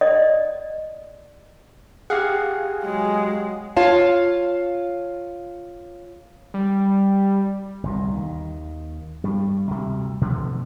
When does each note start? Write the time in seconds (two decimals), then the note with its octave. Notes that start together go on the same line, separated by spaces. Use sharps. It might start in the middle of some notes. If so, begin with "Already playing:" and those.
0.01 D5 D#5
2.10 G4 G#4 F5 F#5
2.84 F#3 G#3
3.77 F4 C#5 F5 A5
6.54 G3
7.83 G1 C2 G2
8.12 D#2 D#3
9.24 G2 G3
9.71 D2 C3 G3
10.21 B2 D3 F3 A3